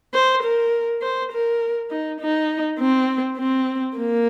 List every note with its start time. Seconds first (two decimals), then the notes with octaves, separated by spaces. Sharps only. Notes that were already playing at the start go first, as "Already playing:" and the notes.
0.14 C5
0.43 A#4
1.02 C5
1.32 A#4
1.91 D#4
2.21 D#4
2.80 C4
3.38 C4
3.98 A#3